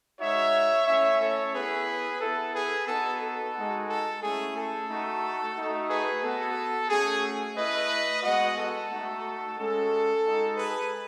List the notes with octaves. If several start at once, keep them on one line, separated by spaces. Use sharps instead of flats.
G#3 D#4 F#4 C#5 E5
A3 C#4 E4 C#5 E5
A4 C#5
B3 E4 G#4 B4
B3 E4 A4
G#4 B4
B3 D#4 F#4 A4
A4
G#3 D#4 F#4
A4
A3 C#4 E4 G#4
A4
A3 D#4 F#4
A3 D#4 F#4
G#4 B4
B3 F#4 A4
A3 C#4 F#4 G#4
A3 E4 B4 D#5
G#3 B3 F#4 D#5 F#5
A4
A3 D#4 F#4
G#3 C#4 F#4 A4
G#3 D#4 F#4
G#4 B4